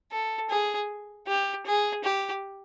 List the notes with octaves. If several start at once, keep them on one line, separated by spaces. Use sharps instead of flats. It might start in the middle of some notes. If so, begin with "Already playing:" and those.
A4
G#4
G4
G#4
G4